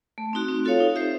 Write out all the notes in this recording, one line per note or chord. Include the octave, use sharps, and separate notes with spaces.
A3
C4 D#4 F#4
C4
F4 A4 C#5 F5
D#4
G4 C5 E5